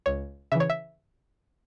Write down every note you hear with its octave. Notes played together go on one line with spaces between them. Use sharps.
C#2 C#5
C#3 E3 E5
C#5
E5